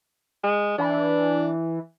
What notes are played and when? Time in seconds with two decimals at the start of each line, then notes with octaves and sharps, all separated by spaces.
0.44 G#3
0.78 E3 D4